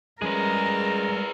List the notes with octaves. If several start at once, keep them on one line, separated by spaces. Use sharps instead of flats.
F3 G3 G#3 C#4 G#4 A#4 B4